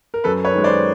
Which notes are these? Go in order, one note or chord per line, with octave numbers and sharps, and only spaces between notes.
A#4
F#2 A4 B4
B4 C#5
D#3 G#3
C5 D5